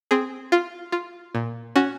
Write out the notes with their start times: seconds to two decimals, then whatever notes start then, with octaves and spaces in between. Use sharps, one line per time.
0.11 C4 G#4
0.52 F4
0.92 F4
1.35 A#2
1.76 C#4 F#4